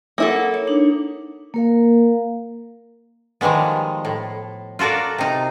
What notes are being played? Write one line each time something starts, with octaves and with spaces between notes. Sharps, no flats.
A#3 E4 A4 F#5
C#5
D4 D#4
A#3 A#4 F5
D#3 F3 G3 G#3 B3
A2
F4 F#4 A4 A#4 D5
C3 D#4